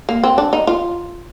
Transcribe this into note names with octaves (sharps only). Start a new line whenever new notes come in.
A#3
C4
D4
D#4
F4